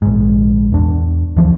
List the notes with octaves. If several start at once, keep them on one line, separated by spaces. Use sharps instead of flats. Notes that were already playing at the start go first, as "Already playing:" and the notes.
A#1 G#2
E2 D4
D2 E3 F3